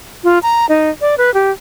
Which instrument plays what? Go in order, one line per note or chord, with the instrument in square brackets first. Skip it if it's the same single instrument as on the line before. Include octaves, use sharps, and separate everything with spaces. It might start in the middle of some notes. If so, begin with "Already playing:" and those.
[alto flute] F4
A#5
D#4
D5
B4
G4